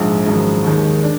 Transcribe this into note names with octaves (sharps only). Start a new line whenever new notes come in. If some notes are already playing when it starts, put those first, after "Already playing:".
Already playing: A#1 G#2 F3 G#3
G#1 F#2 F3 G#3
D#2 D#3 G#3
D4